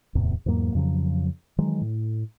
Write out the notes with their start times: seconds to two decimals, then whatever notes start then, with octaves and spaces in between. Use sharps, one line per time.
0.15 D1 E2 A2 C3
0.46 E2 G#2 F#3 A#3
0.75 F2 C#3 F3 F#3
1.58 D#3 E3 F#3 G#3
1.82 A2